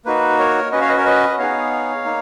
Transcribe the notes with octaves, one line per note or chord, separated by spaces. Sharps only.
A#3 D#4 F#4 B4
A#4 C#5
C#4 F#4 B4 D#5
C#5 F5
B4 D#5
A#4 C#5
B4 D#5
B3 D#4 G#4 C#5 F5
A#3 D#4